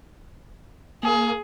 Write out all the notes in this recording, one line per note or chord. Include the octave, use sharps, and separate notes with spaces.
A#3 G#4